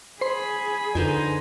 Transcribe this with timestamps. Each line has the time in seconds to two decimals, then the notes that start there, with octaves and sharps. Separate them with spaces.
0.21 G#4 C5 B5 C6
0.95 F2 D3 D#4 B4 C5 G#5